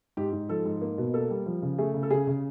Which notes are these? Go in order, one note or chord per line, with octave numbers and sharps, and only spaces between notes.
G#2 G4
G#2
F3 A4
G#2
A#3
B2
A#3 A4
G3
F3
C#3
A3 G#4
C#3
A4
C#3 G#4
C#3